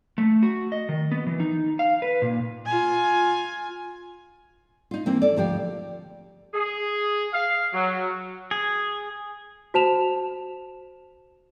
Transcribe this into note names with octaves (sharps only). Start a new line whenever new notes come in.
A3
F#4
D#5
D#3
B3
E3
D#4
F5
B4
A#2
F4 G#5
D#4 F4
E3 A#3 C4
A4 D5
D2 F3 G4 D5
G#4
F5
F#3
G#4
F#4 C5 A5 E7 F7